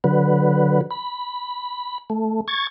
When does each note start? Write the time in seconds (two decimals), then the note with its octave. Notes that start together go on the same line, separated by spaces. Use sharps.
0.04 D3 F#3 B4
0.91 B5
2.10 A3
2.48 C#6 G#6 A6